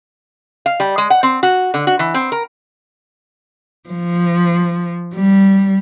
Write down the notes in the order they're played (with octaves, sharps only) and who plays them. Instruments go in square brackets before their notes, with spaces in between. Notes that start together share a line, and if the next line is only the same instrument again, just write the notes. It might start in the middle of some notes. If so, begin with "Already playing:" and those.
[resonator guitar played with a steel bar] F5
G3
G#3
F#5
C4
F#4
D3
F#4
E3
C4
A#4
[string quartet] F3
G3